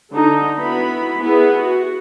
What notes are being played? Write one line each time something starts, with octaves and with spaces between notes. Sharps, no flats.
D3 D#4
B3 E4 F#4 B5
B3 E4 G#4 B4
F#4